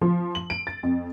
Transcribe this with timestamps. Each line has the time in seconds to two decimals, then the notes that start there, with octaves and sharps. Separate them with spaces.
0.02 F3
0.35 F#7
0.50 D7
0.67 A6
0.83 F2